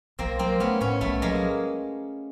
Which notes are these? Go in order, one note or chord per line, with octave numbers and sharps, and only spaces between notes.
B1 A#3 C4
F#3 A#3 C4
A3 B3 C#4
A2 B3 C#4
B1 A3 B3
F#3 G#3 A#3